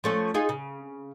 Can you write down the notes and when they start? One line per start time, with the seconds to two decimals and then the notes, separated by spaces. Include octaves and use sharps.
0.04 F3 A3 C#4
0.34 D#4 F4 G#4
0.49 C#3